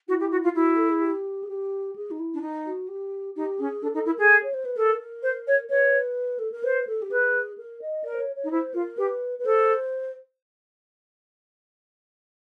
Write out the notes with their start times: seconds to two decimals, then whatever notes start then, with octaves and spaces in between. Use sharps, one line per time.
0.08 E4 F#4
0.20 G4
0.31 F#4
0.44 F4
0.54 E4 F#4
0.76 A4
0.89 G#4
1.01 G4
1.43 G#4
1.49 G4
1.96 G#4
2.11 D#4
2.19 E4
2.34 D4
2.42 D#4
2.66 F#4
2.89 G4
3.36 D#4 G4
3.60 C#4 G#4
3.82 D4 A4
3.94 D#4 A4
4.06 E4 A#4
4.18 G#4 A4
4.43 C#5
4.54 C5
4.65 B4
4.76 A4 A#4
5.00 A#4
5.23 C5
5.47 C#5
5.70 B4 C#5
6.39 A4
6.52 A#4
6.63 B4 C5
6.87 A4
7.02 G4
7.11 G#4 B4
7.58 A#4
7.82 D#5
8.04 A#4 D5
8.14 C5
8.20 C#5
8.36 C#5
8.44 D#4
8.51 E4 C5
8.74 F4 A#4
8.98 G4 B4
9.39 B4
9.45 A4 C5